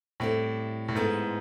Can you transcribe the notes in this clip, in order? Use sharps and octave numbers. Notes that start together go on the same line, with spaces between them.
A2 G3 C4 E4 A4 D5
A2
G#2 G#3 B3 E4 A4